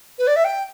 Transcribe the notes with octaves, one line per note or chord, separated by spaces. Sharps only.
B4
D5
E5
G5